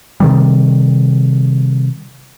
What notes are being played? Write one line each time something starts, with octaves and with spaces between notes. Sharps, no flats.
C3 D#3 G3